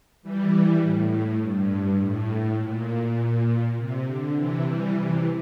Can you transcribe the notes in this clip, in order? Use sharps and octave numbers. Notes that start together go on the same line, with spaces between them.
E3 G3
A2
G2
A2
A#2
C3
D3
C3 E3
E3 G3
C3 E3